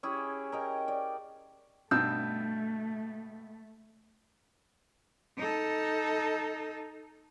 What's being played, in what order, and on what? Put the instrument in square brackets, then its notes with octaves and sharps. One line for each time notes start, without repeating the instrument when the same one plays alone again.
[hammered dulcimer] C#4 E4 G4 G#4
A#4 D#5 G5
D5
[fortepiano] G2 B2 E6 [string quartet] A3 [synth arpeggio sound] C4 D#4 [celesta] G6
[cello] D#4 A4